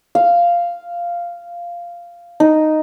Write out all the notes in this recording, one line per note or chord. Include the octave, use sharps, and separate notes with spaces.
F5
D#4